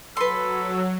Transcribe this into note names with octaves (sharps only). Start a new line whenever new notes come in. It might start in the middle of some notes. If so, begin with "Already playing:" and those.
F#3 A4 B4 C6